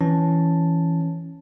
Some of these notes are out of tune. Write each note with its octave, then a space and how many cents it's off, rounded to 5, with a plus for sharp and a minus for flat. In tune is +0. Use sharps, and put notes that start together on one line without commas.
E3 +0 C#4 +0 A5 +0